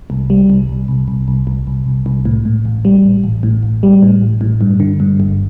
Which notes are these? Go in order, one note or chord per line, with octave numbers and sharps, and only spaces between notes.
C2
G3
C2
C2
C2
C2
C2
C2
C2
C2
C2
A2
A2
A1
G3
A1
A1
A2
A1
G3
A2
A1
A2
G2
D3
G2
G1